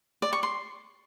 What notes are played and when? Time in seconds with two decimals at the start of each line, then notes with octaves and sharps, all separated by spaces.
0.22 D5
0.33 C#6
0.43 C6